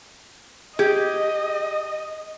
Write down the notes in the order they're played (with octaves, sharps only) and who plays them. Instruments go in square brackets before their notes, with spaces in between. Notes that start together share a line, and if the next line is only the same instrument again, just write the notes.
[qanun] G4 [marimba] G#4 [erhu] D#5